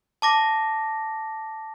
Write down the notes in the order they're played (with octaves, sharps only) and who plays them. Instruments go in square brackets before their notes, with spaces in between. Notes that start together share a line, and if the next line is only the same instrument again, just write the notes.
[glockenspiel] A5 D6 A#6